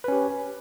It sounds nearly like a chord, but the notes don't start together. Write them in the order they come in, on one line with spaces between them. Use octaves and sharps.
B4 C#4 G4